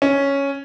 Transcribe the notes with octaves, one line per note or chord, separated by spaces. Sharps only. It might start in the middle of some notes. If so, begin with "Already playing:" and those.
C#4